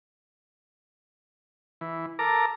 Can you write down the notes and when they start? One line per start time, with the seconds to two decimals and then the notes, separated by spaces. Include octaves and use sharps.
1.81 E3
2.19 A4 A#4 A#5 D6